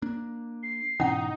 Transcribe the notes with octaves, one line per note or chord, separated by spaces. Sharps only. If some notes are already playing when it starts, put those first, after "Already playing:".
A#3 D4
C7
G#2 B2 E3 C#4 D#4 F#5